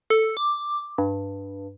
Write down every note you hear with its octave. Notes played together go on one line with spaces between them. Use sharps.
A4
D6
G2